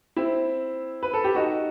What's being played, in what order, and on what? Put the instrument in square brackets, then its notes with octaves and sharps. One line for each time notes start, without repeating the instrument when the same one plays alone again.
[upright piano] C4 E4
B4
A4
G4
D#4 F#4